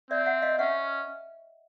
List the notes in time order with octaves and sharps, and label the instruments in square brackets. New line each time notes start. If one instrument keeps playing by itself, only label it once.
[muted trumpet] C4 [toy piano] D5 E5
[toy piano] E5 F#5
D#5 F5
[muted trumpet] C#4 [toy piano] E5 F#5